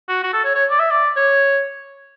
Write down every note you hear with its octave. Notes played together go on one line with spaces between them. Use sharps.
F#4
F#4
A4
C#5
C#5
D5
E5
D5
C#5